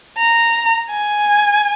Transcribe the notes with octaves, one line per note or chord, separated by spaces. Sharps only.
A#5
G#5